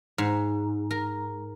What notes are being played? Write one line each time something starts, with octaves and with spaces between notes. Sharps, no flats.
G#2
A#4